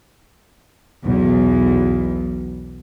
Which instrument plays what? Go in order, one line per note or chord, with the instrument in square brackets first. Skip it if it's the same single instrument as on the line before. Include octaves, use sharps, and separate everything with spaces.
[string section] B1 E2